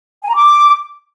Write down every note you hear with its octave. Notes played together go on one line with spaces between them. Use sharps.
G#5
A#5
D6